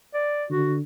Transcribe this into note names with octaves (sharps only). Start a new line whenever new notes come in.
D5
D3 F#4